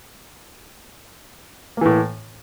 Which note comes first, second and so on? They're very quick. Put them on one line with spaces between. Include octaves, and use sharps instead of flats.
A#3 E3 A2